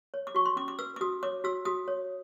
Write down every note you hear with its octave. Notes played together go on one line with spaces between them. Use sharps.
C#5
D6
F#4 C#6
C6
C#4 D6
D6
B4 E6
D6
F#4 D#6
C#5 D6
F#4 E6
F#4 D#6
C#5